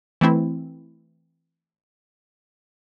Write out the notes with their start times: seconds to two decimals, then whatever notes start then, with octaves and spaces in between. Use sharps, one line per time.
0.21 E3 A3 C4 E4